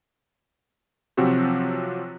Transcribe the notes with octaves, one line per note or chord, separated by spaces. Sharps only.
C3 F3 F#3 C4 F#4 G4